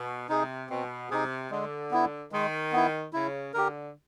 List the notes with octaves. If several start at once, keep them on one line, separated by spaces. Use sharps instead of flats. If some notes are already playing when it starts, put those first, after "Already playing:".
Already playing: B2
C3 D#4 G#4
B2 C4
C3 D#4 G#4
D3 G#3
B3 E4
D#3 G#3
B3 E4
C#3 E4
D3 G4 A#4